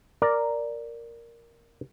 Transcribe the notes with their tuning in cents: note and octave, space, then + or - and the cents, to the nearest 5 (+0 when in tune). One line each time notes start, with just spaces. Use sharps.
A#4 +0 D5 +0